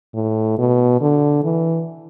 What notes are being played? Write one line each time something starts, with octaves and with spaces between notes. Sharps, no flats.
A2
B2
D3
E3